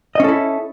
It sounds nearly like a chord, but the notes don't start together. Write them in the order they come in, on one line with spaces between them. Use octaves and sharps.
D#5 C#4 A4 E4